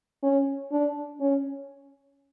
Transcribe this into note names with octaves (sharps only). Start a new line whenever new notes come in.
C#4
D4
C#4